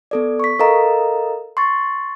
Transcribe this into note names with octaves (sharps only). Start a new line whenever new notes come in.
B3 A4 D5
C#6 B6
A4 A#4 D#5 F5 A#5
C6 C#6 A6